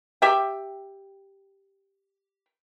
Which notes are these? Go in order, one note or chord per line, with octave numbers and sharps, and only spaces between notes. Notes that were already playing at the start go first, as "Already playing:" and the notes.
G4 E5 G5